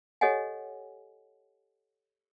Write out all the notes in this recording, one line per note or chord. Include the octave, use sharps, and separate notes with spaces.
G4 A4 C#5 D#5 F#5 G#5